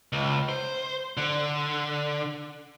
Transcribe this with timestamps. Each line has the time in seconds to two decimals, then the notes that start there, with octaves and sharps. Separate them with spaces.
0.13 C#2
0.49 C5
1.17 D3